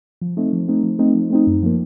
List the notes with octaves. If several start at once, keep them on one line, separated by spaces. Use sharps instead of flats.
F3
A3 C4 D#4
F3
A3 C4 D#4
F3
A3 C4 D#4
F3
A3 C4 D#4
F#2
F3 A#3